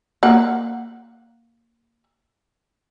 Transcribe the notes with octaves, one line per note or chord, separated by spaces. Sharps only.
A#3 F#5